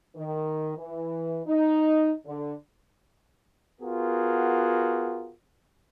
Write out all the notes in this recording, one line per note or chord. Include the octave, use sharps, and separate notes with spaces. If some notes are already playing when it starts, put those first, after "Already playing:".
D#3
E3
D#4
D3
B3 F4 F#4 G#4 A#4